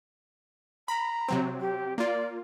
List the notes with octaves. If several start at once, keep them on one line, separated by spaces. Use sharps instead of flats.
A#5 B5
C3 F#3 C4
G4
A#3 F4 D5